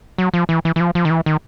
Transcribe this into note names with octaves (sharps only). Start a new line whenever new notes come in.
F#3
F3
E3
E3
E3
F3
F3
D#3
E3
D#3